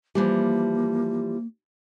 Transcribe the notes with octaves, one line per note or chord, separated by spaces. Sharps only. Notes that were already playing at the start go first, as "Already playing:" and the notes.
E3 F3 G3 A#3